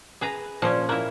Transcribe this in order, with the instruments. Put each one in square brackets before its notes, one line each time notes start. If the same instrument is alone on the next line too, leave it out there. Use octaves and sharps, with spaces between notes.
[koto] G#4 B4 A#5
[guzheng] A#2 C#4 [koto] F3
[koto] A#3 E4